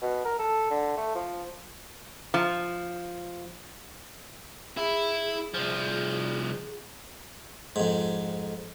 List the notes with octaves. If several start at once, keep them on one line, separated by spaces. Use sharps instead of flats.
B2
A#4
A4
D3
A3
F3
F3
E4 G#4
C2 F3
F2 G#2